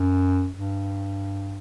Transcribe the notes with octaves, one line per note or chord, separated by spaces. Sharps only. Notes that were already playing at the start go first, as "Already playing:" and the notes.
Already playing: F#2
G2